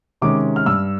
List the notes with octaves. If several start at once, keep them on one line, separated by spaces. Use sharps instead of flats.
C3 D#3 G#3 C#4 D6
F6
G2 E6